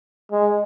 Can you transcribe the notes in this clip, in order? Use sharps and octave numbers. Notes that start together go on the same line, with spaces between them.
G#3